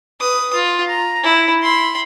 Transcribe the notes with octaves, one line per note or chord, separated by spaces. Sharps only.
B4 D#6
F4
A#5
E4
B5 C6